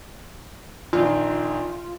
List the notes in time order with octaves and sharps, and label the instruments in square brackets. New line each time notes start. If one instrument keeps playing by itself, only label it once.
[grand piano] A#1 D#3 [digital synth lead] F4